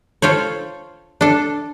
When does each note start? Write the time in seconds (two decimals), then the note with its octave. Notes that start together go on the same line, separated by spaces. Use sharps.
0.22 F4 A4 C5 C#5
1.21 D4 A4